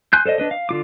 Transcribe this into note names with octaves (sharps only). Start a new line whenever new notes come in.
G#5 C6 F#6 G6
A4 C5 D5 D#5
D4 B4 D#5
F5
D3 F4 D6